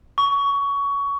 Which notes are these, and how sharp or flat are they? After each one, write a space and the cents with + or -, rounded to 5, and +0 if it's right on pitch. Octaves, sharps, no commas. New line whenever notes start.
C#6 +20